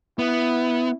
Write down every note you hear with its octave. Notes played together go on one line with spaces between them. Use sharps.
B3 E4